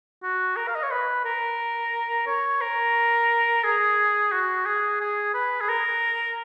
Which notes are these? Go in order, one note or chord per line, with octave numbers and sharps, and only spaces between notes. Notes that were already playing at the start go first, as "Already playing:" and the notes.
F#4
A#4
F5
D#5
C#5
B4
A#4
C#5
A#4
G#4
F#4
G#4
G#4
B4
G#4
A#4